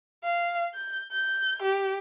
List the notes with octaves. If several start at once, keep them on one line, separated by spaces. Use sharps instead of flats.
F5
G6
G6
G4